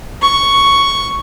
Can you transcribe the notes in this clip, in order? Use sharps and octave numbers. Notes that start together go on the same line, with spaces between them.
C#6